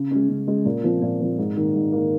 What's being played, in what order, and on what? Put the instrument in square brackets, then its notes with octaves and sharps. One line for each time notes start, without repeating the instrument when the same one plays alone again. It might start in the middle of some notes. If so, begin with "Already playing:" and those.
Already playing: [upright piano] C#3
G#3 C#4
C#3
G#3 C#4
A#2
F3 C4
A#2
F3 C4
G#2
D#3 A#3
G#2
D#3 A#3